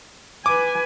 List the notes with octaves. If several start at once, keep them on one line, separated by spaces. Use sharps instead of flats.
B4 G#5 D6